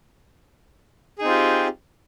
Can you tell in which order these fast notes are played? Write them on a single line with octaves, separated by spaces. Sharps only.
G#4 D#4 C4 F4 G4